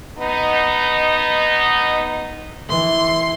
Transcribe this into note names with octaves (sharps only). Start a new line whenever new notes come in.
B3 D#4
E3 C6